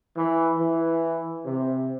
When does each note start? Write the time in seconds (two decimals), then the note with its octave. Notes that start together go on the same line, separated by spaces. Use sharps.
0.16 E3
0.58 E3
1.45 C3